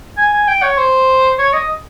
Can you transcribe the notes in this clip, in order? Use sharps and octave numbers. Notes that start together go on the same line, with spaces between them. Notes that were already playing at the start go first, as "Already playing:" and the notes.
G#5
G#5
G5
C#5
C5
C#5
D#5